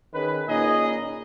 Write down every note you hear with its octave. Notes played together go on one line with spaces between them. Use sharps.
D#3 C#4 G#4 B4
A#2 C#4 D#4 G#4 D#5